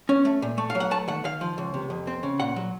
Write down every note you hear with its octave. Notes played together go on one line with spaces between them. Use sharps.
C#4
A3
A#2
A3
F5
F#3
F#5
A3 A5
D#3 F#5
D#3 F5
F3
C#2
C3
F2
C4
C#3
A#2 F#5
F#3